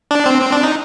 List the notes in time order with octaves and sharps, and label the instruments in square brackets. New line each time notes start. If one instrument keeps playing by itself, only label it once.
[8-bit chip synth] D4
C4
C4
D4
D#4